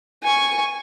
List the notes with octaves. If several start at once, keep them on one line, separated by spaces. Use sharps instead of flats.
G#5 C#6